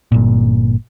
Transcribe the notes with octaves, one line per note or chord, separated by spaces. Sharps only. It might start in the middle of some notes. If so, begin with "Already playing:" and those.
G1 A#2